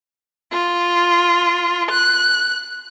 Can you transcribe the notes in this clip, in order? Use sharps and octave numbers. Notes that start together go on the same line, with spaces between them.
F4
F#6